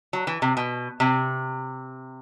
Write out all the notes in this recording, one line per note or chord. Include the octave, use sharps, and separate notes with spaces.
F#3
E3
C3
B2
C3